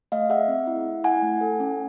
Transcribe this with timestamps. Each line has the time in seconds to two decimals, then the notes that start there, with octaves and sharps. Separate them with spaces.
0.12 A3 D#5 F5
0.29 G#4 E5 F#5
0.48 C4
0.67 E4
0.86 A3
1.04 E4 F#5 G#5
1.22 A3
1.41 A4
1.60 C#4